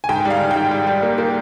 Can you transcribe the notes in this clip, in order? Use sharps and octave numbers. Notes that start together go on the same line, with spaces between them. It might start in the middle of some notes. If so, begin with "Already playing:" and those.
G#5
G#2 G5
G3
F5
D#3
G#2 G5
G3
G3
A#3
A#3